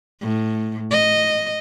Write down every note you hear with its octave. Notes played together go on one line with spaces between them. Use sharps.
A2
D#5